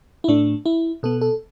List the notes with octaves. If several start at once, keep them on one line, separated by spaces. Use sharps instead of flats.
E4
A2 A3 D4
E4
B2 B3 A4
A4